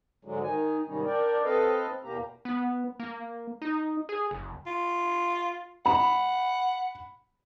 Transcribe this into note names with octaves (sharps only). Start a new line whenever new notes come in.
G#2 D3 F#3 G#3
D#3 D#4 G#5
G#2 C3 D#3 G3 C#4 D#4
D4 A#4 D5 G5
C4 A4 B4 D#5 F5
E2 B2 A#3 G4 A#5
B3
A#3
D#4
G#4
F#1
F4
F#5 B5